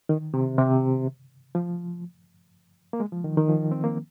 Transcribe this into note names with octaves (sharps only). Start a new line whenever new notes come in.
D#3
C3
C3
F3
A#3
G#3
F3
D#3
D#3
F3
C4
A#3